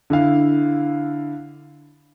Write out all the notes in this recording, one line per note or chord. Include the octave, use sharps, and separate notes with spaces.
D3 E4 F5